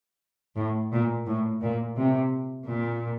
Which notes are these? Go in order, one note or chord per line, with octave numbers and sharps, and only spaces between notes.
A2
A#2
A2
A#2
C3
A#2